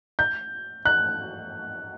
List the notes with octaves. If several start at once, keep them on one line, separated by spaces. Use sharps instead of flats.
G6
F#6